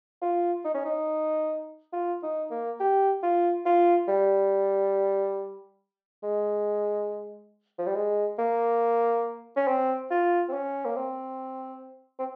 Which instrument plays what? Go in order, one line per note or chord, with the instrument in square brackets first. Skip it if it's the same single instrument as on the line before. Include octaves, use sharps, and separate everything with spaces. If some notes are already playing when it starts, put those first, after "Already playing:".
[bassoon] F4
D#4
C#4
D#4
F4
D#4
A#3
G4
F4
F4
G3
G#3
F3
G3
G#3
A#3
C#4
C4
F4
C4
C#4
A#3
C4
C4